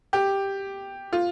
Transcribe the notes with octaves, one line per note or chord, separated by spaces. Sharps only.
G4
F4